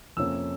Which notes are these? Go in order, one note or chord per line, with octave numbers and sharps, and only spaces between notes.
F2 C3 F3 A#3 C#4 E6